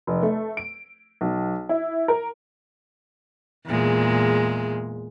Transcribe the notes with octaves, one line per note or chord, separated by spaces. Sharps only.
F1
A3
D7
B1
E4
A#4
E2 A#2 G#3